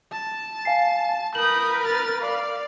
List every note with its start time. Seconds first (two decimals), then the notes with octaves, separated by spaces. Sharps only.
0.12 A5
0.65 F5 G#5 C7
1.35 A#4 B4 D#6 G6 F#7
1.85 F6 A6
2.21 D5 F5